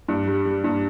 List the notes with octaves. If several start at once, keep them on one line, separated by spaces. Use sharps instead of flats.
G2
G3
G3
G2